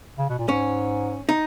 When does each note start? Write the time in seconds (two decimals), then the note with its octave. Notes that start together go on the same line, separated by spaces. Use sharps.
0.19 C#3
0.29 B2
0.39 A#2
0.48 G#2 C#4
1.29 D#4